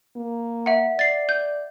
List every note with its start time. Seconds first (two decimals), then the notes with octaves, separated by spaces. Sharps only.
0.16 A#3
0.66 E5 F#5
0.99 D5 A6 C7
1.29 G6